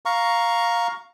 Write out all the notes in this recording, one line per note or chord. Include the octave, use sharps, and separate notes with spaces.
F5 A#5 C#6